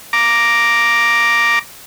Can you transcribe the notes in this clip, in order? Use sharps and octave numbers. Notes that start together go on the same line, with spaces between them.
A#5 D6